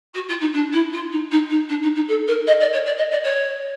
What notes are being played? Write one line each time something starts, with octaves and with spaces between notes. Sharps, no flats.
F#4
F4
D#4
D4
E4
F4
D#4
D#4
D#4
D4
D#4
D#4
A4
A#4
D#5
D5
C#5
D5
D#5
D5
C#5